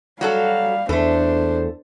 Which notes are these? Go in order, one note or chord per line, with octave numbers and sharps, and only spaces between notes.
F#3 G3 F#4 A4 F5
E2 A3 D4 A4 C5